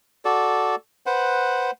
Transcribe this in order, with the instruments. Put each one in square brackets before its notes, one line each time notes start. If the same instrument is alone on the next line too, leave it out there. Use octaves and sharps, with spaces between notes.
[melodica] F#4 A4 D5
B4 C5 F#5